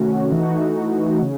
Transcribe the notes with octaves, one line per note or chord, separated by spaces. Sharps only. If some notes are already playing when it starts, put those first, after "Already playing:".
Already playing: C3 D#3 A3 C#4 F#4
E3 A3 D#4 F#4
C#3